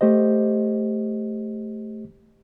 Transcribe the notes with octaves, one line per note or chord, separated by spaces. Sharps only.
A3 G4 C5 D#5